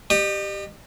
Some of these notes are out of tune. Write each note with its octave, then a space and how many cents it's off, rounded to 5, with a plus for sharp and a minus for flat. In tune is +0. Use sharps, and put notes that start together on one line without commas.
G4 +0 D#5 -45